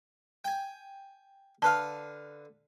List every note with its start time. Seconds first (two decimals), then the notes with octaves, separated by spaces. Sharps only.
0.45 G5 G#5
1.62 D3 B4 F5 A5